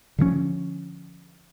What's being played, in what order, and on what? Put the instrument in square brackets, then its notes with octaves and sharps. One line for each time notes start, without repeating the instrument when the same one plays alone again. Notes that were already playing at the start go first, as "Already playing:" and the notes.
[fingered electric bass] D3 F3 A3 C#4